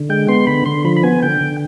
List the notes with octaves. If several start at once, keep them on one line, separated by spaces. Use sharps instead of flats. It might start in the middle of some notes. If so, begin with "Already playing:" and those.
Already playing: D3
G#3 G5
B3 C6
D3 B5
D3 C6
F3 B5
B5
B3 G#5
D3 G5
D3